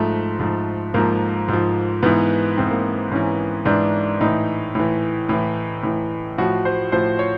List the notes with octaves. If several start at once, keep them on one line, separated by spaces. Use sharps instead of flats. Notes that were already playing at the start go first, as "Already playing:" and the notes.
Already playing: G#2 F3 A3
G#2 F3
G#2 F3 A#3
G#2 F3
G#2 E3 B3
G#2 E3 C4
A#3
G#2 E3 C#4
G#2 E3 D4
A2 E3 D#4
A2 E3
A2 E3
A2 E3
A2 F3 F#4
C5
A2 F3 C5
C#5